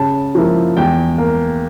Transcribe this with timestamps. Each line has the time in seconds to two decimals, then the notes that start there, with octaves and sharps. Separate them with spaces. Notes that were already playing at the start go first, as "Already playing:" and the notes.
Already playing: C#3 A5
0.35 F3 A#3 E4
0.77 E2 G5
1.18 A#3